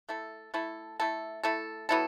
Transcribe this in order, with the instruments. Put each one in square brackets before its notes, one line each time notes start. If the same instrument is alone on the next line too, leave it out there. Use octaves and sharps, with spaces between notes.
[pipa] A3 E4 A4
A3 E4 A4
A3 E4 A4
A3 E4 A4
F#3 B3 E4 A4